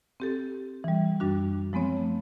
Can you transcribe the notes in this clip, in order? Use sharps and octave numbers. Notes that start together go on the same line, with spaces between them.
C4 G4 A4
E3 G3
F#2 G3 D4 F#4
F3 G#3 B3 C4 C#5
A3